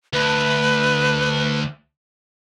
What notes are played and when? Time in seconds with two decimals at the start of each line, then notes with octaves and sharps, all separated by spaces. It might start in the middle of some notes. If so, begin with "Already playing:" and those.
0.13 D2 B4